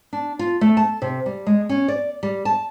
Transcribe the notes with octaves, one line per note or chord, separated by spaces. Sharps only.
D4
F4
A3
A5
C3
G3
G#3
C#4
D5
G3
A5